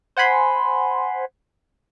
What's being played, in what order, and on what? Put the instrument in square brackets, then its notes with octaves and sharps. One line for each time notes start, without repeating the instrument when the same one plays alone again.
[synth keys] C5 F#5 G#5 B5 C6